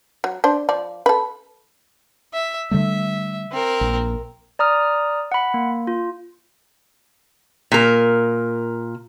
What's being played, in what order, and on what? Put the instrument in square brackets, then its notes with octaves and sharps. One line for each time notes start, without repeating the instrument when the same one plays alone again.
[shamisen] F#3
D4 C5
F3 D5
A4 B4
[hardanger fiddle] E5
[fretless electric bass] D3 G3 A3 [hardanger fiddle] E5
[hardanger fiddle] C4 A#4
[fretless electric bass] A#1
[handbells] D5 A#5 D#6 F6
F#5 B5
A#3
F4
[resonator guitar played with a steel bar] A#2 A#4